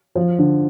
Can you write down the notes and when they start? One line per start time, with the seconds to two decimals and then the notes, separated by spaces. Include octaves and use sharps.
0.15 F3
0.39 D3